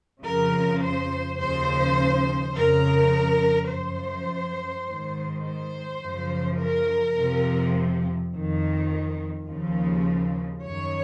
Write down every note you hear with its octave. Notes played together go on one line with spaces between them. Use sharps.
F2 C#3 F3 A#4
C5
D#2 C#3 F3 C5
F2 C#3 F3 A#4
F#2 F3 C5
G#2 D#3
C5
F#2 C#3 F3
A#4
F2 C3 F3
F2 D#3
D#2 C#3 F3
F#2 D#3 C#5